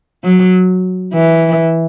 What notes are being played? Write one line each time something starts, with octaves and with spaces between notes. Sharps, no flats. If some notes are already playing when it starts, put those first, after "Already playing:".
F#3
E3